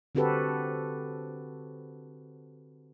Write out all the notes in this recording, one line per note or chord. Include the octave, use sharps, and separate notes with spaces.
D3 C4 F#4 G4 A4 B4